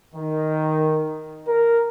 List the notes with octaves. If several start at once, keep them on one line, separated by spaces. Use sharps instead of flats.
D#3
A#4